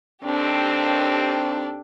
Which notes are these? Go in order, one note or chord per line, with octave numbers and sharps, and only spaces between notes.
D#2 C4 D4 G4 A4